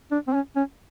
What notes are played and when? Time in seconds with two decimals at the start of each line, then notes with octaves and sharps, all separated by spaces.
0.11 D4
0.27 C4
0.33 C#4
0.56 C#4